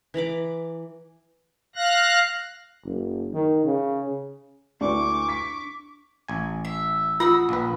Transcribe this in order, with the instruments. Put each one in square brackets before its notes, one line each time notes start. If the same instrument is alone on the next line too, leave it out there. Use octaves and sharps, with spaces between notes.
[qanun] E3 A#5 B5 D6
[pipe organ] F5 F#6 A#6
[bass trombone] F#1
D#3
C#3
[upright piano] D2 E4 B4 [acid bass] D4 [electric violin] C#6 D6
[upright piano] B6
[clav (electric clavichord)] A1 G#5
[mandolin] E5
[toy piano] F4 [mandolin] F#5 D#6 E6
[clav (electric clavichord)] A#1 B4